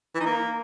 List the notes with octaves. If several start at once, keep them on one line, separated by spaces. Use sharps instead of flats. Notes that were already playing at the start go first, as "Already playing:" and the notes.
E3
D#4
A#3